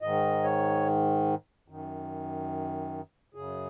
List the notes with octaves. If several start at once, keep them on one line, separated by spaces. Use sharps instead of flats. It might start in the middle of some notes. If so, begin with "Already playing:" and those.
G#2 D#3 D#5
C#5
F#2 D#3
F#2 C#3 G#4